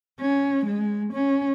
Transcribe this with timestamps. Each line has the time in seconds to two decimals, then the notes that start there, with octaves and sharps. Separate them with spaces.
0.20 C#4
0.65 G#3
1.13 C#4